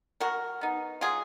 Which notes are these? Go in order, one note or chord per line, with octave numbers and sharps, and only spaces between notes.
F#3 F#4 A#4
B3 D#4
F#3 F4 G#4